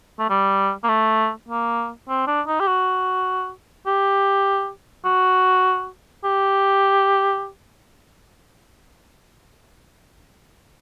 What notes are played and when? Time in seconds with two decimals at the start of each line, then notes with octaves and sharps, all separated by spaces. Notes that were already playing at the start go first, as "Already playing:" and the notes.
0.19 A3
0.30 G3
0.84 A#3
0.89 A3
1.49 A#3
2.09 C4
2.27 D4
2.47 D#4
2.60 G4
2.67 F#4
3.86 G4
5.05 F#4
6.24 G4